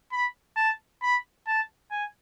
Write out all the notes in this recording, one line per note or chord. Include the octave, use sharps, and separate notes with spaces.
B5
A5
B5
A5
G#5